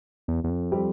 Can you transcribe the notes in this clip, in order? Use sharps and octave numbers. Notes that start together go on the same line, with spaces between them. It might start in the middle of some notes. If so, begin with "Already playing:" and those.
E2
E2
F2
G3 C4 G4